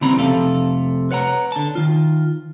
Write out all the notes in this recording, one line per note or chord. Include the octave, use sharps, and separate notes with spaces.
C#3 E3 G3 C4 A#5 B5
F2 C3 A3 A4 F5
B4 C#5 F#5 G#5 A#5
D3 A5
D#3 F4